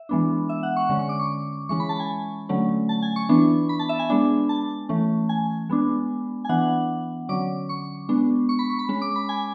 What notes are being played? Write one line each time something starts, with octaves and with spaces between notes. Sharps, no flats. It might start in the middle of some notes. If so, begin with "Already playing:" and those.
Already playing: E5
E3 G#3 B3 D4
E5
F#5
C#6
D3 G#3 C#4
C#6
D6
C#6
E3 G#3 C#4 C#6
B5
A5
G#5
D3 F#3 A3 C#4
A5
G#5
C#6
E3 B3 D4
B5
A5
E5
G#5
G#3 B3 D4
A5
E3 A3 C#4
G#5
G#3 B3 D4
G#5
E3 B3 D4 F#5
D3 F#3 C#4 D6
C#6
G#3 B3 D4
C#6
B5
C#6
B5
G#3 C#4
D6
B5
G#5